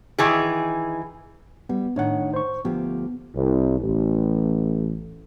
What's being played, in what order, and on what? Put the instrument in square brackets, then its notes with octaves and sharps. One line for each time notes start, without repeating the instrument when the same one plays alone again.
[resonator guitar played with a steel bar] D#3 E3 G#4
[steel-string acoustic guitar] G3 [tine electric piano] B3
[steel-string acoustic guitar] A2 D#3 [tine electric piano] D4 C#5 F#5
[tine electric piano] C5 C#6
[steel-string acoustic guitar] D2 F3 G4 [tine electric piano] B3
[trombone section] C2
A1